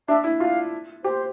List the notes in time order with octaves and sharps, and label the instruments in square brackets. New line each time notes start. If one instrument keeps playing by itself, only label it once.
[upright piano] D4 [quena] E5
[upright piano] E4
[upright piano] F4 [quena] F5
[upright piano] G4 [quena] C5